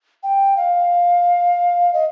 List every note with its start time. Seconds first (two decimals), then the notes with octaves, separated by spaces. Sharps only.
0.23 G5
0.57 F5
1.93 D#5